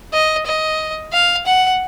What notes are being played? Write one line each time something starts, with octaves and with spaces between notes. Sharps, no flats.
D#5
D#5
F5
F#5